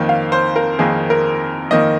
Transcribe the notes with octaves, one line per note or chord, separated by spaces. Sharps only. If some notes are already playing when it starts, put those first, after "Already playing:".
Already playing: F2 D#3 A#3
F5
C5
A#4
F2 D#3 A#3 G#4
A#4
F2 D#3 A#3 D#5